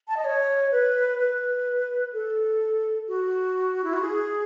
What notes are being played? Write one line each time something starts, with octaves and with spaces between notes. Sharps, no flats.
A5
D#5
C#5
B4
B4
A4
F#4
E4
F#4
G#4